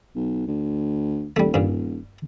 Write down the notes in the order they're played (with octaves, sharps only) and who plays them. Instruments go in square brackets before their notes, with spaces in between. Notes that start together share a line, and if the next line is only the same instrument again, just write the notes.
[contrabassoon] B1
D2
[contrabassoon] D#1 [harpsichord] G3 A3
[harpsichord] G2 A#2